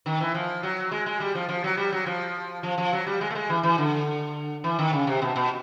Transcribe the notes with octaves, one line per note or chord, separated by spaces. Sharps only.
D#3
E3
F3
F#3
G#3
G#3
G3
F3
F3
F#3
G3
F#3
F3
F3
F3
F#3
G3
G#3
A3
G#3
E3
E3
D3
E3
D#3
C#3
C3
B2
B2